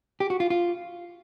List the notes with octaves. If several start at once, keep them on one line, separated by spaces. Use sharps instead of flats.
G4
F#4
F4
F4